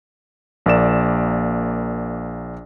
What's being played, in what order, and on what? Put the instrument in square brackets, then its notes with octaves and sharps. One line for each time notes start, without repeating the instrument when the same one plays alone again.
[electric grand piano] A#1 A#3 D5 E7